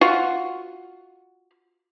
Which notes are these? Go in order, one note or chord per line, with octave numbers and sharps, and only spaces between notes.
F4 F#4